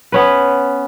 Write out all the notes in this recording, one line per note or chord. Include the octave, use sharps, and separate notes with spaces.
B3 C#4 B4